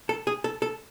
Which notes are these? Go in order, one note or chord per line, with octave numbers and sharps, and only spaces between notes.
A4
G#4
A4
A4